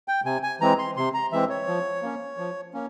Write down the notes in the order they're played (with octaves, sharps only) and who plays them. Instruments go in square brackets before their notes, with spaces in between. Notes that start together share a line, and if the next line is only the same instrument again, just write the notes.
[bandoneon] G5
C3 G#5
G#5
E3 G#3 C4 A#5
C6
C3 C6
A#5
E3 G#3 C4 E5
C#5
F3
A#3 C#4
F3
A#3 C#4